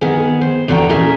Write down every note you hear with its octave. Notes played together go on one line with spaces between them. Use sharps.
D#3 B3 G#4
C5
E2 D3 F#4 C#5 G5 A#5
A#2 C#4 G#4 A#4 E5